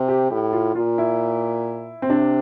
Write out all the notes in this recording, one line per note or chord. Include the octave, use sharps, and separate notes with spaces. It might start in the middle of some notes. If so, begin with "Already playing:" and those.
Already playing: C3
G4
A2 G4
F4
A#2 F4
E4
C4
C3 D4